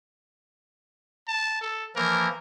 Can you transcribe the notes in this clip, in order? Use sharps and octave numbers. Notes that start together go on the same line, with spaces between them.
A5
A4
E3 F3 A#3 A#4